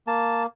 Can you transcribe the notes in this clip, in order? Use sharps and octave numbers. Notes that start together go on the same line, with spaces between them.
A#3 A5